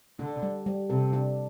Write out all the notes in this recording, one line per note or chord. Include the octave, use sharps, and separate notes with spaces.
D3 D4
G3
G3
C3 A4
D4